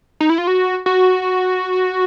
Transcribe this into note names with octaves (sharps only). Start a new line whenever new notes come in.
D#4
E4
F4
F#4
F#4